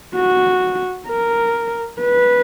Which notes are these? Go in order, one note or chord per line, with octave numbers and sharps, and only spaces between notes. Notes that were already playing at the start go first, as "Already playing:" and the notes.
F#4
A#4
B4